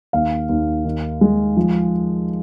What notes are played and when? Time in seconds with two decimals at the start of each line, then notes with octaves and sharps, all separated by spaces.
0.13 D#2 F5
0.49 D#2
0.85 D#3
1.21 G#3
1.57 F3